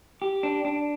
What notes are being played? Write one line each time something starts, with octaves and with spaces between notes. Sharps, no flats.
G4
D4
D4